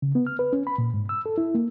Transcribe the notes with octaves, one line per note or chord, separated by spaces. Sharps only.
C#3
B3
F6
B4
C#4
B5
A#2
G#2
E6
A4
E4
A#3